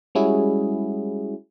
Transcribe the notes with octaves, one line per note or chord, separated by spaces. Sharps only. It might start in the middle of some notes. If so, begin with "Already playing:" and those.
G3 G#3 C#4 E4 F#4 G#4